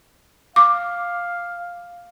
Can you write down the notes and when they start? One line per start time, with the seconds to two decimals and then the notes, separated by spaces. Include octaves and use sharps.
0.56 F5 D6